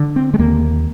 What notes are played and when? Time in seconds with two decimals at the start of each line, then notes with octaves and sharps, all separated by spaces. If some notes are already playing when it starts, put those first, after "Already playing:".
Already playing: D3
0.16 C4
0.34 G#3
0.39 D#2 A#3